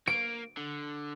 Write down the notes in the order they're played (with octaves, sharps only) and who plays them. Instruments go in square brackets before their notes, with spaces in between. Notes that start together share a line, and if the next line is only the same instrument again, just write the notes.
[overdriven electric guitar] A#3 [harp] D7
[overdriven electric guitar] D3